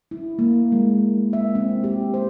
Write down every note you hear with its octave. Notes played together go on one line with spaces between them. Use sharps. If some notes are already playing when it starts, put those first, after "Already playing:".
E4
A#3
G#3
E5
C4
G4
C5